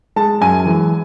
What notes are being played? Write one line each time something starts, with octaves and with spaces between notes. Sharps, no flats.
G#3 A5
F#2 G#5
E3 G#3